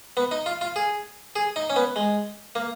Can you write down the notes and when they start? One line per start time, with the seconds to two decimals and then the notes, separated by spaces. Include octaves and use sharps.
0.17 B3
0.31 D#4
0.46 F4
0.61 F4
0.76 G#4
1.36 G#4
1.56 D#4
1.70 C#4
1.76 B3
1.96 G#3
2.55 A#3